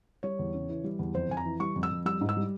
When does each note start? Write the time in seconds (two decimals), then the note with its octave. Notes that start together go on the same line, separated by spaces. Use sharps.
0.23 G3 C#5
0.39 E2
0.54 C#3
0.69 E3
0.84 G3
0.99 E2
1.14 F2 C5
1.29 F2 G#5
1.37 A#5
1.45 E3
1.60 G3 C#6
1.76 F2
1.83 E6
1.91 F2
2.06 G3 E6
2.21 G#2
2.29 E6
2.37 G3